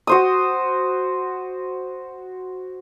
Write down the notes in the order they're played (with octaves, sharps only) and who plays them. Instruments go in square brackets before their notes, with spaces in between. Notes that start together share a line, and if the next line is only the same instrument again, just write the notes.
[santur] F#4 C5 D#6